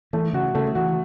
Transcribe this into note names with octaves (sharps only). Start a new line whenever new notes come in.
E3 A3
C#3 F#4
C#3 A3
E3 F#4